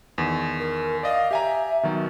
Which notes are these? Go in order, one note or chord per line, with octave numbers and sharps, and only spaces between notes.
E2 D#3
A#4
D5 D#5 F5
G4 E5 G#5 A#5
B2 D#3 F#3